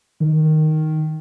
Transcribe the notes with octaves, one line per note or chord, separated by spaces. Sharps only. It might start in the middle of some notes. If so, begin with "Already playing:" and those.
D#3